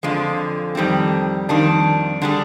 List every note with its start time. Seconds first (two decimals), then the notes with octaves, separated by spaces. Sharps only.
0.03 F2 D3 F3 G#3
0.75 F2 D#3 G3 C4
1.49 F2 D#3 G3 D4
2.22 D3 G3 D4 G#4